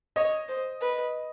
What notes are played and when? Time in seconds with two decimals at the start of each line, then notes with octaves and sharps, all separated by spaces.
0.16 C#5 D#5
0.49 C5
0.81 B4